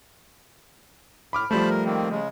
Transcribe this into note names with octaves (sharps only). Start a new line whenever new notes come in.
A2 B5 D6 F6
F3 G3 A3 C5 A5 B5
A#4
D#3 A#3 C4
C#3 G#3